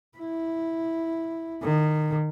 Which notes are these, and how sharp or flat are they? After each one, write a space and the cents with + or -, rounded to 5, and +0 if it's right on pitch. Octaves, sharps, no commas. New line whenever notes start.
E4 -5
D#3 -25